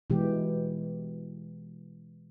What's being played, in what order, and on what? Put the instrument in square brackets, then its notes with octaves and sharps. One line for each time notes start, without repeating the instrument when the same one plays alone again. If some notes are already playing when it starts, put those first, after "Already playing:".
[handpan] B2 E3 G#3 G4